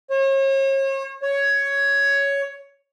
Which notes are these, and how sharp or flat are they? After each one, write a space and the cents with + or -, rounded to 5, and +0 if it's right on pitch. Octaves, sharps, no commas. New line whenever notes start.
C#5 -40
C#5 +10